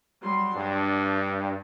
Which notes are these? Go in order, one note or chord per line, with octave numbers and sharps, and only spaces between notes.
F#3 G3 C6
G2 D4